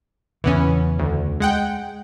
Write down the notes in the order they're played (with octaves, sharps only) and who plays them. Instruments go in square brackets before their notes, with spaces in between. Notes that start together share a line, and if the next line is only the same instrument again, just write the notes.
[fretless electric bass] E2 A#2 C#3 [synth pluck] E3 B3 C#4
[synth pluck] D2
G#3 F#5 G5